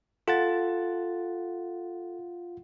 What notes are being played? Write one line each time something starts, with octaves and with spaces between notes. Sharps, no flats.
F4 A4 F#5 A6